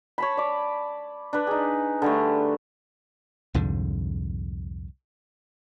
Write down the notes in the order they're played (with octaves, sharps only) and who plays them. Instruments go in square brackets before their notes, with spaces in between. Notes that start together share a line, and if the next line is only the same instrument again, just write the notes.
[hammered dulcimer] C#5 A5 B5
D5 D6
D4 B4
D#4 G#4
D3 G3 A3
[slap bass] C2 F2 G#2 D3